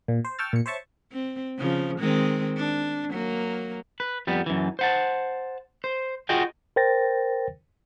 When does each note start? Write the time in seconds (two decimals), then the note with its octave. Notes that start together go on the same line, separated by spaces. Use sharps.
0.08 A#2
0.25 C5
0.39 G5 A5 C#6 E6 F6 A6
0.53 A#2 C#7
0.66 C5 C#5 E5 A5 C#6
1.12 C4
1.58 C#3 F3
1.99 D#3 G#3 C4
2.57 D4
3.10 F#3 A#3
4.00 B4
4.27 F2 G3 B3
4.46 F#2 E3
4.79 C5 F#5 A5
5.84 C5
6.29 F4 F#4 G#4 D#5 G5
6.76 A#4 C5 G5 A6 A#6